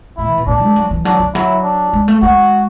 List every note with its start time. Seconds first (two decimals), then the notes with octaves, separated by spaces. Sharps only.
0.18 G#2 E4
0.27 E3
0.38 B2
0.47 A2 D4
0.62 G#3
0.76 F#3
0.91 E3
1.05 F#3 D4
1.20 D3
1.35 F#3 E4
1.63 D4
1.93 G#3
2.08 A3
2.22 G#3 F#4